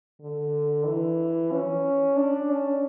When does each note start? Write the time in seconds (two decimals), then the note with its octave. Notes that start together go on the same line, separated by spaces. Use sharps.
0.21 D3
0.86 E3
1.52 C#4
2.17 D4
2.50 C#4